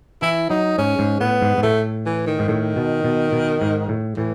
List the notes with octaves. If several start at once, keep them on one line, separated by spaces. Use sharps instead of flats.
E3 E4
F#3 D#4
G#2 C#4
G#2
A2 B3
G#2
G#2
A2 A3
E3
D#3
G#2
A2 D#3
B2
B2
B2
G#2
A2
A2 E3